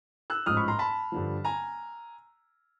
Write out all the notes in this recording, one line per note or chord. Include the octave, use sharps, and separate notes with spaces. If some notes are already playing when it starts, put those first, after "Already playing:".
E6 F#6
A1 G#2 F3 D#6 F6
B5 C#6
A#5 C6
A5 B5
G2 D3 F3
G#5 A#5